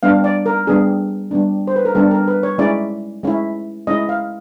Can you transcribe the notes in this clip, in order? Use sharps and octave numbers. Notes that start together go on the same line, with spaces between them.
G3 B3 D4 F5
D5
A#4
G3 B3 D4 G#4
G3 B3 D4
C5
B4
A#4
G3 B3 D4 A4
A#4
B4
C#5
G#3 C#4 E4 D5
G#3 C#4 E4
G#3 C#4 E4 D#5
F5